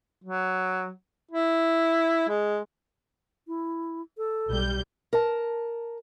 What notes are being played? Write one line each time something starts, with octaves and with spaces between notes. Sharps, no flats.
F#3
E4
G#3
E4
A4
B1 G3 G6
A#4 A5